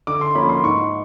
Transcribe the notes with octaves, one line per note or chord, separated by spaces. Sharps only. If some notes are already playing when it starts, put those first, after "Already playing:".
D3 D6
C6
F3 A#3 C#4 F4 B5
C6
G#2 C#6